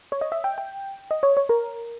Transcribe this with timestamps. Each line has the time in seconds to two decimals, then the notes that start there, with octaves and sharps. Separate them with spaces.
0.12 C#5
0.21 D#5
0.32 E5
0.44 G5
0.58 G5
1.11 D#5
1.23 C#5
1.37 C#5
1.49 A#4